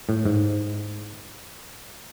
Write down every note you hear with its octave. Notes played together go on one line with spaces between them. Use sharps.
A2
G#2